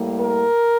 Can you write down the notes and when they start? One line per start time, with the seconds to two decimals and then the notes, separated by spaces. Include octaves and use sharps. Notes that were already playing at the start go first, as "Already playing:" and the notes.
Already playing: A2 G3 A#3
0.21 A#4